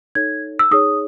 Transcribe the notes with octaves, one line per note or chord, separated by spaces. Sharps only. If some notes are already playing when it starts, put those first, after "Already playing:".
D#4 A4 C#5 G#6
E6
D#4 G#4 C#5 D#6